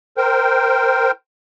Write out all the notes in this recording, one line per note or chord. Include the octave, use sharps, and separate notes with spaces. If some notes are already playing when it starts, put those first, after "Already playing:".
A#4 C5 G5